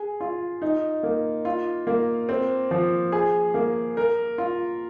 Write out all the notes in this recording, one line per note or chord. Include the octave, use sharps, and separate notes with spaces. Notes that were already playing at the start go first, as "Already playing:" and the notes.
Already playing: G#4
F4
D#4
A#3
F4
A#3
C4
F3
G#4
A#3
A#4
F4